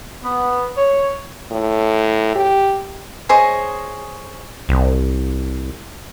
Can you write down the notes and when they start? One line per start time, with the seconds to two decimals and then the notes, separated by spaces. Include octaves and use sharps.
0.24 B3
0.78 C#5
1.51 A2
2.36 G4
3.29 G#4 C5 C#5 D#5
4.69 C2